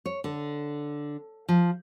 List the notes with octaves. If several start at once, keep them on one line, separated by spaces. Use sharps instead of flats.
C#5
D3
F3